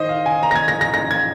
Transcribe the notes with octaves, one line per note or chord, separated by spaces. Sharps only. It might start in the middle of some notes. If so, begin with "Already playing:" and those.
Already playing: D#3 C5 D#5 D#6
F5
G#5
A#5
A#6
G#6
A#6
A#6
A#6
G#6